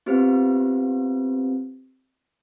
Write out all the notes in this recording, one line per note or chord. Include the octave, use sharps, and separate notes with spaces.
B3 C4 F4 G4 B4 C5